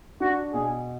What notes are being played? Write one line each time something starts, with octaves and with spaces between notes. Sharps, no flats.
D4 F#4
B2 G#4